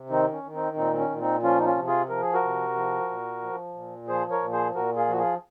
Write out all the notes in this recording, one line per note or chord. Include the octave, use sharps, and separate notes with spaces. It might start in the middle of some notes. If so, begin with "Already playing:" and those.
Already playing: C3
D#3 C4 D#4
C#4
D#3
C4 D#4
A#2 C4 D#4
C4
C#4
A#2
C4 D#4
F3 C#4 F4
D#4
C#4 F4
C3
F4 G#4
F3 A#4
G#4
F#4 A#4
C3
F3
A#2
F3
A#2
F3 G#4 C5
A#4 C#5
A#2
G#4 C5
A#2 F#4 A#4
F4 G#4
F3 F#4
F4 G#4